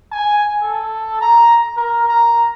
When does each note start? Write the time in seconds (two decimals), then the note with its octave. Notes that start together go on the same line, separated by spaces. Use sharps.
0.12 G#5
0.62 A4
1.21 A#5
1.76 A#4
2.08 A#5